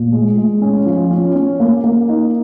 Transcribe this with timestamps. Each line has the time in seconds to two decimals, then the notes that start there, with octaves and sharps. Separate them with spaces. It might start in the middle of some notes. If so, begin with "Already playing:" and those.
Already playing: A#2
0.13 G#3
0.37 G#3
0.62 C#4
0.86 F3
1.11 C#4
1.35 C#4
1.60 A#3
1.84 A#3
2.09 D#4